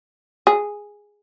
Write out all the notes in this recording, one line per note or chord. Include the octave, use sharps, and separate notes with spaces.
G#4